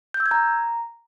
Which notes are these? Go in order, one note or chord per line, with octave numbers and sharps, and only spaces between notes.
G6
E6
G#6
A#5